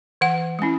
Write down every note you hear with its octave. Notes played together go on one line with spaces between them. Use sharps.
E3 F#5
G#3 C#4 E4